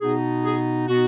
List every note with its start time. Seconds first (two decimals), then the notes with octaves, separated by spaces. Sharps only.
0.01 B2 B3 D#4 G#4
0.44 G#4
0.87 B2 B3 D#4 F#4